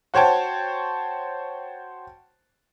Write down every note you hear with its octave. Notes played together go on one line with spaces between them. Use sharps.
F#4 C5 C#5 G5 A5